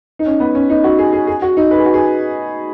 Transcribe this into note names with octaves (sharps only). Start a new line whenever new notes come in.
D#4
C#4
B3
C#4
D#4
F#4
G#4
G#4
G#4
F#4
D#4
B4
G#4
F#4
G#4